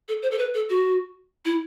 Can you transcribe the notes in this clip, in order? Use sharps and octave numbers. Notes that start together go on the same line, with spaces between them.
A4
C5
A4
B4
A4
F#4
E4